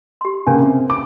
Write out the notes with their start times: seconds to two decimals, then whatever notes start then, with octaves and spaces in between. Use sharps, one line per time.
0.21 G4 C6
0.47 C#3 A#3 C#4 D4 G#5
0.62 C3
0.90 D6